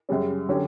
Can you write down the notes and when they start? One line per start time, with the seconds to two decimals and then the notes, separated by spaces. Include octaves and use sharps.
0.09 F#2 C#3 G3 C#4
0.49 D3 F#3 C#4 G4